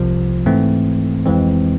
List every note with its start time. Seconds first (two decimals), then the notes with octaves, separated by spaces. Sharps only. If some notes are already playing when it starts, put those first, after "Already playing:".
Already playing: C2 C3 F3
0.46 G#2 E3 A3 C4
1.26 F2 E3 G#3 C4